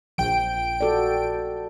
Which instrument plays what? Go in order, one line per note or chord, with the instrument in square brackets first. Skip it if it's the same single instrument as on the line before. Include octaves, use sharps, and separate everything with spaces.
[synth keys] A#1 G5 D7 [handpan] F3
[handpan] F#4 A4 D5